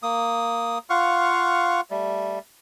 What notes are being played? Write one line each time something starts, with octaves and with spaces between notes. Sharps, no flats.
A#3 D#6
F4 F5 F#5 C#6
G3 A3